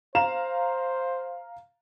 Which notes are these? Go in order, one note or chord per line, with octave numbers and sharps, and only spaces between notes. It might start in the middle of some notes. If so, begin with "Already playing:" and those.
C5 F5 A#5 E7